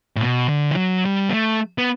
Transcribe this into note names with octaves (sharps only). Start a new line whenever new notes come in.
A2
B2
D3
E3
F#3
G3
B3
A3
B3